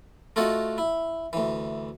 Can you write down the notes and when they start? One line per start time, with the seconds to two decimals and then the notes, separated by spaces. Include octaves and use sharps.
0.36 A3 F4 F#4 A4 D#5 F#5
0.78 E4
1.33 D2 E3